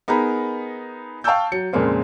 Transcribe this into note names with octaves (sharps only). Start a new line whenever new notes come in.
B3 D#4 G#4 A#4 A#5 B5
F5 G5 A5 C#6 E6 G6
F#3 C#7
F2 A#2 C#3 G#3 A#3 C4